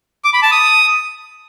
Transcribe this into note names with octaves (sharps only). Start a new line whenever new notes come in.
D6
B5
A5
D#6